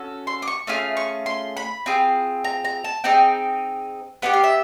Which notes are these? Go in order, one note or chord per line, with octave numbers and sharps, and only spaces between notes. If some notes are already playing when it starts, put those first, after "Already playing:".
Already playing: C#4 F#4 A4
C6
D6
C#6
A3 C#4 F4 G#4
C#6
C6
B5
C4 F4 G#4
A#5
A#5
A5
C4 D#4 G#4 G5
B3 D4 G4 F#5
F5
E5